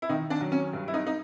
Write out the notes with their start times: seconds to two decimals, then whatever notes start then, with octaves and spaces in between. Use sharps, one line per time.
0.02 E4
0.09 D#3 D#4
0.30 D4
0.41 F#3
0.52 C#4
0.73 G2
0.88 E4
0.94 D#4
1.07 D#4